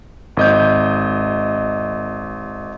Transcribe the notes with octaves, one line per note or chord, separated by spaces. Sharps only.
G#1 D#5 G6